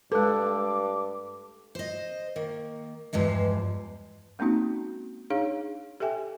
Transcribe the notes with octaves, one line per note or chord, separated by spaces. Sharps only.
G2 G#3 A4 B4 D6
C5 D#5
D#3 A#3
E2 G2 F3 G#3
G#3 A#3 C4 C#4 D#4 F#4
D4 D#4 G#4 C#5 F5
G4 A4 E5 G5 G#5